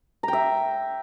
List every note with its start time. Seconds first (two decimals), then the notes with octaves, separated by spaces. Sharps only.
0.23 A#5
0.28 G5
0.33 E5